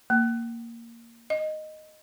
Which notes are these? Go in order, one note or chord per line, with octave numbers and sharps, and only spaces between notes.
A#3
D#5